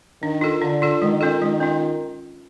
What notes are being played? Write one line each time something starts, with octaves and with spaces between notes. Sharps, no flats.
D#3 D4
F4 A4
D3 D4
F4 A4
D#3 G#3
C#4 F4 A4
D#3 G#3
C#4 F4